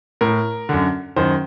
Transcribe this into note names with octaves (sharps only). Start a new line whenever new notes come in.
A2 A#4
F#2 D3
F#2 D#3 C5